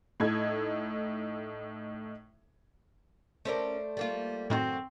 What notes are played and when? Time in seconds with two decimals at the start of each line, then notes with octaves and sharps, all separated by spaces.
0.20 A2 D#4 A4 G#6
3.45 A3 C#4 A#4 C5 D5
3.97 G3 A#3 F4
4.50 F#2 A2 D#3 C4 F#4